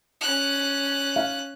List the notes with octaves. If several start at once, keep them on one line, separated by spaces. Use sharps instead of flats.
C#4 F#6
F5